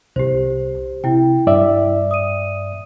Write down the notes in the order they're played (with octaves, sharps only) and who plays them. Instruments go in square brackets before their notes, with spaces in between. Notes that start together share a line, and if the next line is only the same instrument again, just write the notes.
[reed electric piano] C2 [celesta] G4 C5
[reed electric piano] C3 [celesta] E4 G5
[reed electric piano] G2 D5 E5
[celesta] D#6 D#7